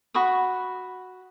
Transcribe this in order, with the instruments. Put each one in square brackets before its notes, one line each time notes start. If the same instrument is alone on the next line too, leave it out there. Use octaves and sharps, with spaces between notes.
[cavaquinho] F#4 B5 C#6 D#6